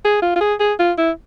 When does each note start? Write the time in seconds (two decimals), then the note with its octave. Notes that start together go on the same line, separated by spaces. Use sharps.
0.05 G#4
0.22 F4
0.36 F4
0.41 G#4
0.60 G#4
0.79 F4
0.98 E4